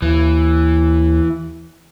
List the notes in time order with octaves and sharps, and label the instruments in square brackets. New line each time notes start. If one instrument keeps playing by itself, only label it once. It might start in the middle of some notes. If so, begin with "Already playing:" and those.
[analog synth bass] D#2 [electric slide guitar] E3